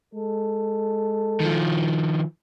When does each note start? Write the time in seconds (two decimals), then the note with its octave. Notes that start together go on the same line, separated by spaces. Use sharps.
0.15 G#3 A4
1.41 D#3 F3